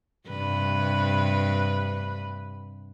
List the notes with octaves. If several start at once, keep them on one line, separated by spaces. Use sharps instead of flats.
G2 C3 B4